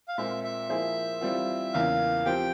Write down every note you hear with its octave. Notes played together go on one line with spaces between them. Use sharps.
F5
A#2 G#3 C4 E5
E5
F3 A#3 E4 G#4 C5
E3 G3 C4 F4
E2 C#3 E3 A#3 F5
F3 C4 G4 G5